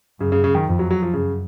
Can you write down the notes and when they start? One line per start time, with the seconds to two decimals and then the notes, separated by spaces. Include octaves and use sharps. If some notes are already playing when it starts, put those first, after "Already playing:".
0.20 F#2 C#3
0.32 C#3
0.44 C#3
0.55 D#3
0.67 F2
0.79 F#3
0.91 F#3
1.03 F3
1.14 F#2 C#3